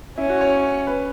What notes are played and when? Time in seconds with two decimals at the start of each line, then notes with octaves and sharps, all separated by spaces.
0.17 C#4 E4
0.29 F#4
0.41 C#5
0.87 B4